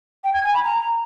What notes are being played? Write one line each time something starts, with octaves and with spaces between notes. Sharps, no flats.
G5
G#6
G#5
B5
A#5